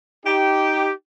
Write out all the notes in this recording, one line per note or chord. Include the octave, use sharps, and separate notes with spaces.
D#4 G4